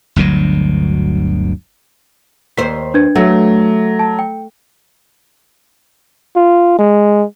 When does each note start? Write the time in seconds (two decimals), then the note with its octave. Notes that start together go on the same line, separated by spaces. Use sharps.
0.16 G1 D2 B2 F#3
2.57 D#2 C5 B6
2.94 D4 B4 G#6
3.16 F#3 A3
3.99 A5
4.19 G5
6.36 F4
6.79 G#3